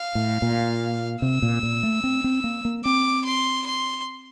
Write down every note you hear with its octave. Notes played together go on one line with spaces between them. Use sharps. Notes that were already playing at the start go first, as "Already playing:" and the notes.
Already playing: F5
A2
A#2
C3 E6
A#2
A#2
A3
C4
C4
A#3
A#3
C4 D6
C6
C6